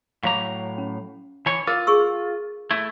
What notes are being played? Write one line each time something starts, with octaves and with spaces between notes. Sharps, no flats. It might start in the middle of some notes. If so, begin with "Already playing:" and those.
A2 F#3 F5 A#5 D6
C#4
E3 C#5 A5
F4 A#4 D6
G#4 C#6 E6
A3 E4